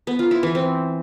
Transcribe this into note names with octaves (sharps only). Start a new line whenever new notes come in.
B3
F4
E4
E3
C4